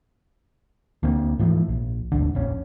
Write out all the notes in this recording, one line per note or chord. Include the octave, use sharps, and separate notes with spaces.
D2 D3 A#3 C4
G#2 E3 F3 A3
A#1
D#1 G#1 D2 D3
F1 A#1 C#4